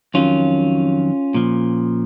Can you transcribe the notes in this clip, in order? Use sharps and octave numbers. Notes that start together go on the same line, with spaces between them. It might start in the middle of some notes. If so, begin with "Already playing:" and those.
F2 D#3 F#3 C#4 F4
A#2 F3